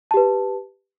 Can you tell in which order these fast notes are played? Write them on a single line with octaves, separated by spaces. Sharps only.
A5 G4 B4